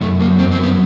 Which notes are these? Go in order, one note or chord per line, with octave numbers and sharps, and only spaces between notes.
F#2 A3
F#3 A#3
F#2 C4
C4
F#3
B3